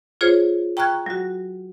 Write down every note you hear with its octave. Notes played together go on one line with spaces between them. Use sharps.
F4 G#4 C5 C#5
G5 A#5 C#6 F6 F#6 G#6
F#3 F#4